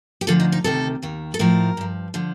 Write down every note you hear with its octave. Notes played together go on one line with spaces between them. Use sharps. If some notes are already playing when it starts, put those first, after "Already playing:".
G4
D2 D3 F3 A4
D#4
D#4
D2 C3 D#3 A4
D#2 D#3
A4
A2 F3 A#4
G2 F3
D3 F3